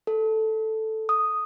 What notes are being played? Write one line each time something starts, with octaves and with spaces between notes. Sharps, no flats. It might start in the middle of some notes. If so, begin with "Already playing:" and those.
A4
D#6